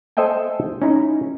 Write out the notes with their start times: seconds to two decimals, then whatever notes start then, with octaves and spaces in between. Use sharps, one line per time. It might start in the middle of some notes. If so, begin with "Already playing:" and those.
0.17 A4 C5 D#5 E5 G5 G#5
0.82 C#4 D#4 E4